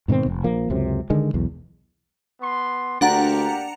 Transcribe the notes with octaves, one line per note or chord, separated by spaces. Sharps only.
G#2 B2 D#3 C4
F1
A#1 F3 A#3
C#2 F#2 C3
D3 D#3 G#3
B1 E2
B3 C6
D2 A#3 D4 G4 F#5 A#5